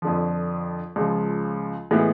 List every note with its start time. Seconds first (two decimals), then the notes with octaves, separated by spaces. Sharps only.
0.02 F2 D3 F3
0.96 C#2 C#3 F3
1.91 A2 E3 G#3 B3